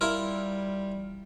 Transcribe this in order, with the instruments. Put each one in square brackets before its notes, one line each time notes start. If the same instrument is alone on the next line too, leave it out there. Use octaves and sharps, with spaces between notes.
[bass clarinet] G3 [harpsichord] E4 F4 A#4